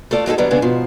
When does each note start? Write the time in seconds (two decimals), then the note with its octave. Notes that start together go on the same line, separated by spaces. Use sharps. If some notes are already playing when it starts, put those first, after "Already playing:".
0.11 A3 F4 A4 D5
0.26 F#3 G#3 D#4 A4
0.38 D3 F#3 G3 B3
0.51 C#3 G#3 B3 D4
0.62 G#2 B2 F3